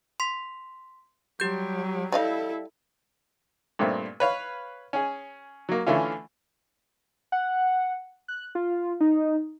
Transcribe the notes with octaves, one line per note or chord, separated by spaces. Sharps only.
C6 B6
F#3 G3 G4 G6
G3 E4 A4 D#5 F5
G2 A#2 A3 C4
B4 C#5 F5
C#4 G#4
F#3 A#3
D3 E3 A3 C#4 F4
F#5
F#6
F4
D#4